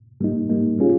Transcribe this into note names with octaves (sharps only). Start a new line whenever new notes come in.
G#2 G3 A#3 D#4
G#2 G3 A#3 D#4
G3 C#4 F4 G#4